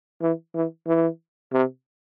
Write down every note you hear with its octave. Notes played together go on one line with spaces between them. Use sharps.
E3
E3
E3
C3